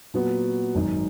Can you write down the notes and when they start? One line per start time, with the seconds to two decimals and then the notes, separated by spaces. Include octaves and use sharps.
0.14 A#2 F#3 B3 F#4
0.75 G#1 F#2 D#3